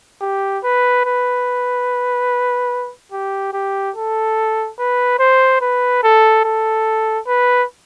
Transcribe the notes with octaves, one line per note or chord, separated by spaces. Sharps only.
G4
B4
B4
G4
G4
A4
B4
C5
B4
A4
A4
B4